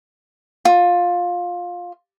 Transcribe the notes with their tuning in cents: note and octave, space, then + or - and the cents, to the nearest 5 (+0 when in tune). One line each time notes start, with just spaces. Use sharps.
F4 +15